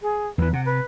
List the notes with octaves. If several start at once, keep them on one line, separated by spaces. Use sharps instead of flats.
G#4
E2 E3 B4
C3 F#5
B4